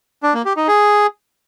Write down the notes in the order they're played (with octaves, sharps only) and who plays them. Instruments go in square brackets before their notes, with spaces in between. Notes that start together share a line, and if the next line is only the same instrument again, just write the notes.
[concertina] D4
A#3
G4
D#4
G#4